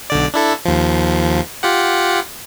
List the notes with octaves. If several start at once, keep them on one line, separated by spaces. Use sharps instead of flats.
B1 D3 D5
D4 E4 A4
D#2 F3
F4 G4 F#5